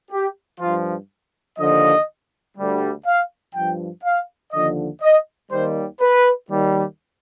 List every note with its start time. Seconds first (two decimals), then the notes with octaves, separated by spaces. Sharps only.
0.12 G4
0.60 G2 F3 F4
1.59 D#2 D3 F3 D#5
2.57 D2 D3 G3
3.05 F5
3.55 G2 F3 G5
4.04 F5
4.53 D#2 D3 F3 D#5
5.02 D#5
5.51 D#2 D#3 G3 C5
6.01 B4
6.49 D#2 D#3 G3